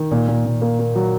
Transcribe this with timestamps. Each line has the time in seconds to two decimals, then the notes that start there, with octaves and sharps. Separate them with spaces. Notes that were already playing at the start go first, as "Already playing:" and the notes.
Already playing: D#3
0.11 A#2
0.28 A#2
0.45 A#2
0.62 A#3
0.79 A#3
0.95 F#3